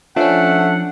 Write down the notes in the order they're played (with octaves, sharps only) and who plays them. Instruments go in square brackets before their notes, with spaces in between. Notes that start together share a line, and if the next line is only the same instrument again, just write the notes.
[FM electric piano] F3 C#4 [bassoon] A3 [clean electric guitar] D4 [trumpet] F#5